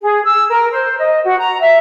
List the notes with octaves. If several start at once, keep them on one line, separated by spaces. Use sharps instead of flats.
G#4
E6
A#4
C5
D#5
F#4
A#5
E5